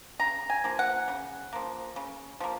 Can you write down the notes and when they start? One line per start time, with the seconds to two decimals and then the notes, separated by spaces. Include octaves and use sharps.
0.20 C#3 A#5
0.50 G#5
0.64 F3 A#3
0.79 F#5
1.08 C#3
1.53 F3 A#3
1.96 C#3
2.40 F3 A#3